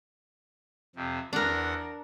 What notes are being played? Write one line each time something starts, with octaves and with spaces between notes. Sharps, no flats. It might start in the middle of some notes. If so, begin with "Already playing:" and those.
F2 C3
E2 D4 A#4 F#5